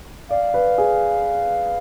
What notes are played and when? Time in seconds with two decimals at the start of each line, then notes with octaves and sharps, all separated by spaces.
0.30 D5 F5
0.54 B4
0.78 G#4